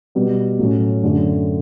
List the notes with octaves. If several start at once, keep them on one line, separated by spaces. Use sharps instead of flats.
B2 G3 B3
A2 F#3 C#4
F#2 D3 A3 D4